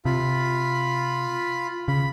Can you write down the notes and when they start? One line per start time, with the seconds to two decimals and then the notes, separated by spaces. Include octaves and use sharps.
0.05 C3 F4 B5
1.88 C#3 B5